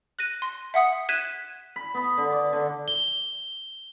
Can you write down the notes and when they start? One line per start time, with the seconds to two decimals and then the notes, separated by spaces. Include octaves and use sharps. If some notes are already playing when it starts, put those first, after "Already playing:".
0.19 F#6 A#6 D#7
0.42 C6
0.74 E5 F#5 D#6 C#7
1.09 F#6 G#6 B6 D#7 E7
1.76 B5
1.94 B3
2.17 D3
2.32 D5
2.53 D3
2.88 G7